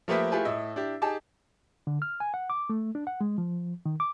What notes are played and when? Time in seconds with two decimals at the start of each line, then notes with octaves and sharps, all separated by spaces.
0.08 F3 A3 A#3 G4 B4 E5
0.32 A3 E4 F4 G4 G#4 B4
0.45 A2 E4 D#5 E6
0.76 D4 E4 G4
1.02 D#4 G4 G#4 G#5 A5 D6
1.87 D3
2.02 F6
2.20 G#5
2.34 F#5
2.50 D6
2.70 A3
2.95 D4
3.07 F#5
3.21 G#3
3.38 F3
3.86 D#3
4.00 D6